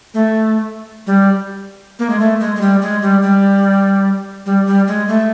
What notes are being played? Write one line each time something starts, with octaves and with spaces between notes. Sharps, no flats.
A3
G3
A#3
G#3
A3
G#3
G#3
G3
G#3
G3
G3
G3
G3
G#3
A3